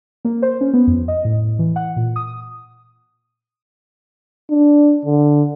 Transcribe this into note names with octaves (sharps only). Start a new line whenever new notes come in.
A#3
C5
C#4
B3
F2
D#5
A2
E3
F#5
A#2
D#6
D4
D3